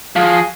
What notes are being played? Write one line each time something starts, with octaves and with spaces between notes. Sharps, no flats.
F3 F#4 G#4